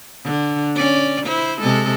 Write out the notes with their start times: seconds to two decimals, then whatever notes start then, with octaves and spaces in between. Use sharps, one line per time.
0.24 D3
0.76 C#4 D5
1.26 E4 C5
1.61 C3 G#3 A4